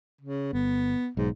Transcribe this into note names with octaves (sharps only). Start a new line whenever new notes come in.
C#3
G1 B3
B1 G#2